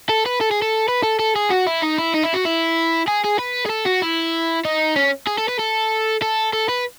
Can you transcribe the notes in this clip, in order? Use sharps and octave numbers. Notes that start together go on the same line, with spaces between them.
A4
B4
A4
G#4
A4
B4
A4
A4
G#4
F#4
E4
D#4
E4
D#4
E4
F#4
E4
G#4
G#4
B4
G#4
A4
F#4
E4
D#4
C#4
G#4
A4
B4
A4
A4
A4
B4